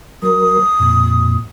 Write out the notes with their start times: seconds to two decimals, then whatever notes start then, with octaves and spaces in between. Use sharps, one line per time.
0.22 F#3 A#4 D#6
0.80 F2 A#2